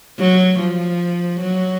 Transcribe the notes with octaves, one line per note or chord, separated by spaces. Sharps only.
F#3
F3
F#3